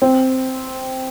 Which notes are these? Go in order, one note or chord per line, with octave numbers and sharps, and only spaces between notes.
C4